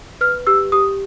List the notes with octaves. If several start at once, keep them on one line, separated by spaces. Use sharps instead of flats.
B4 F6
G4 E6
G4 D#6